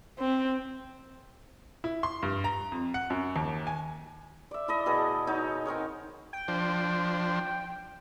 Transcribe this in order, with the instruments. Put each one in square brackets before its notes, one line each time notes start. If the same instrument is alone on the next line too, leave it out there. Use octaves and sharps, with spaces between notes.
[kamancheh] C4
[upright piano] E4
C6
G2
A#5
F2
F#5
F#2
D#2
G#5
[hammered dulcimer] D5 E5
E4 A4 D5 D#5
B2 G#4 A4 B4
D#4 F#4 C#5
C4 D#4 A#4 C#5
[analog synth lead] G5
[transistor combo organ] F3 D4 C5